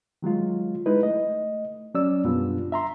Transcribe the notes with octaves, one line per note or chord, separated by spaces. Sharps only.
D#3 F#3 G#3 F4
G#3 D#4 E4 B4
A3 D#5
F#3 C#4 D5 E6
F#2 B2 G3 B3 D4 F4
E5 A#5 C6